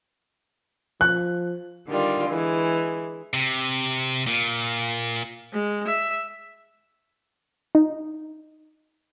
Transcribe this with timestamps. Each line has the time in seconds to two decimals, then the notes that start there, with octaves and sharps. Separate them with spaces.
1.01 F3 F#6
1.88 D3 D#3 G3 F4
2.29 E3 G#3
3.33 C3
4.27 A#2
5.53 G#3
5.87 E5
7.75 D#4